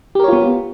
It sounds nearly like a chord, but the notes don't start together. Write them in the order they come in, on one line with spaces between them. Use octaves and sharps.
G4 A#4 C#5 F4 B3